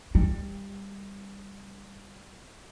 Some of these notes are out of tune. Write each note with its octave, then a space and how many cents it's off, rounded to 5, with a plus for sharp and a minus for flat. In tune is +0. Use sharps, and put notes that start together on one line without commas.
G3 +15